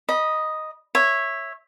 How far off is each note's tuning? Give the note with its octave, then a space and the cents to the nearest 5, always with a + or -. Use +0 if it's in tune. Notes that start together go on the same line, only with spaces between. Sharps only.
D#5 +0 B5 -30
C#5 -15 E5 +0